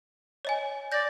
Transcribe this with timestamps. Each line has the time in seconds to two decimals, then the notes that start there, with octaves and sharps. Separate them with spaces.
0.45 C#5 D#5 G#5
0.92 D5 G6 A#6